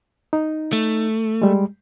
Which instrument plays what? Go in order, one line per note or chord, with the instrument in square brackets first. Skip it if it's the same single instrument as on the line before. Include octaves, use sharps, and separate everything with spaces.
[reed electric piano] D#4
[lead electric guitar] A3
[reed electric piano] G3 G#3